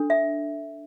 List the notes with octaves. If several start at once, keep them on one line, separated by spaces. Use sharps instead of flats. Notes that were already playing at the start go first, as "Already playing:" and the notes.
Already playing: D4 A4
E5